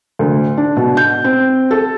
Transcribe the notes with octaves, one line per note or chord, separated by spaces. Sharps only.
D2
D4
B2
G6
C4
A4